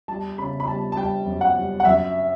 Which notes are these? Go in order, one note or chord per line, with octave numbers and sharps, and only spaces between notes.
G3 A5
C#3 B5
B5
G3 A5
A5
G3 G5
F#2
F#5
G3
F#5
F#2 E5